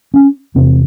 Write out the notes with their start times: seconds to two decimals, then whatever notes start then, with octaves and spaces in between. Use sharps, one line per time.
0.14 C#4
0.55 E2 C3 C4